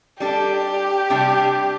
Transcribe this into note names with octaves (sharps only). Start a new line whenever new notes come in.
G3 D4 G4 A4
C3 G3 D4